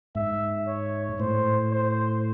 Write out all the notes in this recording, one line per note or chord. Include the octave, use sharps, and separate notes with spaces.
G#2 E5
C#5
A2 C5
C5